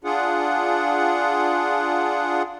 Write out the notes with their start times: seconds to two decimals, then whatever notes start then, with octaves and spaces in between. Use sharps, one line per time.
0.04 D4 F4 G#4 F#5